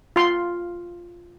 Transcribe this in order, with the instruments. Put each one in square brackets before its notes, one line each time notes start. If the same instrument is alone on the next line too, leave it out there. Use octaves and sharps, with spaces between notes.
[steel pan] F4 C6